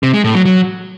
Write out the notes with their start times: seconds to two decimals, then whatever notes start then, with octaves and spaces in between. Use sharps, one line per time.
0.03 C3
0.14 G#3
0.24 A2
0.35 F#3
0.45 F#3